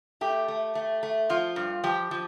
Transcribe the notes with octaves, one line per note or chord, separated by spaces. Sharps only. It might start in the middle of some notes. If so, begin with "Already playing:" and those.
A3 G4
A3
A3
A3
F3 F4
G2
F3 G4
F3